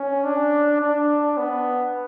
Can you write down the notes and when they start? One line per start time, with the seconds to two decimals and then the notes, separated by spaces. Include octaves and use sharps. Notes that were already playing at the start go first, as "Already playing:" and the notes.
Already playing: C#4
0.24 D4
0.81 D4
1.37 B3